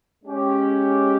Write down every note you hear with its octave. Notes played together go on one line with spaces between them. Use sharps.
G#3 C#4 G4